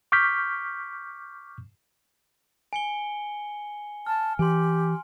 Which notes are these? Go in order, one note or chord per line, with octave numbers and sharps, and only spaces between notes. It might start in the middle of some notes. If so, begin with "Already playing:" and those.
C#6 D6 F6 G6 B6
G#5 C#7 G7
A5 F6
E3 G4 G#5 C6